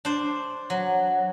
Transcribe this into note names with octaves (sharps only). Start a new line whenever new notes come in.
D4 C5
F#3